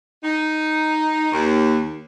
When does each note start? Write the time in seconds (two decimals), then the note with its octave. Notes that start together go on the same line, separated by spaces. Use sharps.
0.24 D#4
1.33 D#2